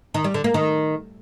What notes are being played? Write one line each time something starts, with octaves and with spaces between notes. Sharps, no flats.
D#3
G3
D3
A#3
D#3